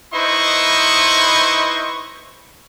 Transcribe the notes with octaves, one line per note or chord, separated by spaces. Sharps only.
D#4 E4 B4 C5 D#5 C#6